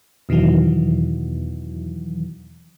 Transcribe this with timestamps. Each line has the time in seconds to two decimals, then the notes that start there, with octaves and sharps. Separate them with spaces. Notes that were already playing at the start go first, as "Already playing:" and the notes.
0.29 E2 B2 D#3 E3 F#3